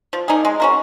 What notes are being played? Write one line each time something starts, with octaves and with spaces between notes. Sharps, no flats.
F3
A#3 D#4 G#4
G#3
C#4 F#4 A#4